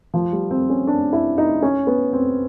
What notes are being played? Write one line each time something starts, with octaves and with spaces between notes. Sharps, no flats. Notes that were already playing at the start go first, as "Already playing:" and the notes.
F3
G3
C4
C#4
D4
E4
D#4
C#4
B3
C4